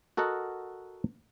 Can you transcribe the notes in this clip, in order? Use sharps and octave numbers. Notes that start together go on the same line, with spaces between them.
F#4 A4 A#4 D#5 F#5